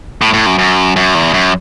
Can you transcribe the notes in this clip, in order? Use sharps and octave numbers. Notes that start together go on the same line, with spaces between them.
A2
A2
F#2
F#2
F#2
E2
F#2